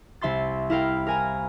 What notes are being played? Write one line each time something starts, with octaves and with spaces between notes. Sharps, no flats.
C2 E5 C6 A6
E4 A#4 F5 G5
A#4 G#5 A#5